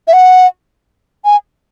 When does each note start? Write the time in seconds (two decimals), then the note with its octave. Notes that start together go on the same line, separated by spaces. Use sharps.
0.08 E5
0.13 F#5
1.25 G#5